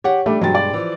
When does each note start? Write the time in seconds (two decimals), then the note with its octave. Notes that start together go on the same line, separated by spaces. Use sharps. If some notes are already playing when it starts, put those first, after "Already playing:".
0.04 G4 C#5 F#5
0.26 G3 A3 D4
0.41 G2 B2 F#3 G#3 A6
0.55 D5
0.73 E3 F3